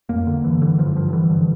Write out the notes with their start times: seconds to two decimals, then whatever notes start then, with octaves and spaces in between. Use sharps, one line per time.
0.09 F2 A#3
0.27 D3
0.44 G2 E3
0.62 D3 E3
0.78 G2 F3
0.96 G2 F3
1.13 D3 E3
1.30 G2